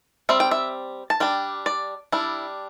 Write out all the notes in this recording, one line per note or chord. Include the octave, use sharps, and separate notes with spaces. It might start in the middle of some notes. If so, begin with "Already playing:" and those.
G3 C4 E5
G5
E5
A5
G3 D4 G5
D5
G3 D4 E4